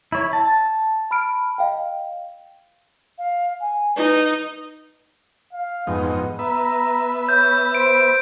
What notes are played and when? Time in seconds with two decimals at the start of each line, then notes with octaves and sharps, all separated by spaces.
0.12 E4 C#5
0.33 A5
1.11 B5 F6 D7
1.58 D#5 F5 G5
3.18 F5
3.60 G#5
3.96 D#4 B4
5.53 F5
5.87 F2 G#2 B3 D#4
6.39 B3 B4 E5 A#5
7.29 C#5 G6
7.75 C5 D7